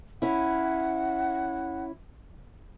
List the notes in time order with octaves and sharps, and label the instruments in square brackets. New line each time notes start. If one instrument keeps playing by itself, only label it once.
[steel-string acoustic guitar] C#4 E4 [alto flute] F#5